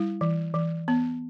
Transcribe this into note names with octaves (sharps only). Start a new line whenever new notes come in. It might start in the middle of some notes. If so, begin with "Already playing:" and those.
Already playing: G3 E4
E3
E3
B3